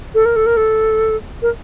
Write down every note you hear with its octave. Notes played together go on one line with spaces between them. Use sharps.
A4
A#4
A4
A#4
A4
A#4